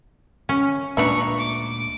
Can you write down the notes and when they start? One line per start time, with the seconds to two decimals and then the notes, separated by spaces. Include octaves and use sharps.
0.49 C#4
0.97 D2 A#2 G#3 D4 B4 E5 A#5 C#6
1.39 D6